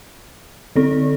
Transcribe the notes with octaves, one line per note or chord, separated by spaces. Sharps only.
D3 C4 A4